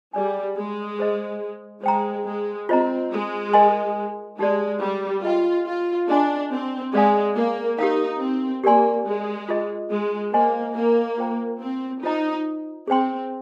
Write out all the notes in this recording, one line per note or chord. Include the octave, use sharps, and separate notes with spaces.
G3 G#4 D5 G#5
G#3
G#4 C5 D#5
G#3 C5 G5 A#5
G#3
C4 F4 C5 D#5 A#5
G#3
A#4 D#5 G#5 C6
G#3 D#4 G4 D5
G3
F4 G#4 D#5 G5
F4
D4 G#4 D#5 G#5 C6
C4
G#3 G#4 D5 F5 G#5
A#3
D#4 G4 A#4 F5
C4
A#3 G4 A#4 D5 G#5 C6
G#3
F4 G#4 D#5
G#3
A#3 C5 D#5 G#5 C6
A#3
F4 C5 G5 A#5
C4
D#4 F4 C5 D#5 A#5
C4 G#4 C5 G5 C6